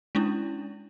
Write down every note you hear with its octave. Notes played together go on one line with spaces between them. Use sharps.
G#3 C#4 D4 E4